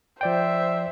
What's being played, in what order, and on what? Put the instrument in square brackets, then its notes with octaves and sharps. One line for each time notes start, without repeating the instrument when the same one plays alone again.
[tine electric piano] F3 D5 G5 [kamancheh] C5 E5